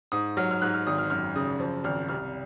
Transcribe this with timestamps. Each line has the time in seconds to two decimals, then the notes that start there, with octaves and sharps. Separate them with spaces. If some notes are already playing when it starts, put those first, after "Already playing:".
0.12 G#2 D#6
0.37 F#3 F6
0.51 F6
0.62 G#2 F#6
0.74 F6
0.87 G#1 D#6
0.98 F6
1.10 F#2 F6
1.36 C#3 D#6
1.60 F3
1.84 G#1 F6
2.09 C2 F6